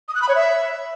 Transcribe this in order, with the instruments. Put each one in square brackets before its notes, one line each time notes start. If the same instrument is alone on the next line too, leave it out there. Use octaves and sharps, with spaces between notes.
[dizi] D#6
F#6
B5
C#5
E5